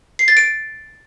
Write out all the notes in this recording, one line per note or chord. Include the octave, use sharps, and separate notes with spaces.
C7
A6
D7